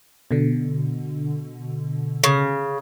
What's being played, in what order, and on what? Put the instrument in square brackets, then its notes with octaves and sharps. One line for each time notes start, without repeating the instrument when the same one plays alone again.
[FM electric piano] B2 D3
[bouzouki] C#3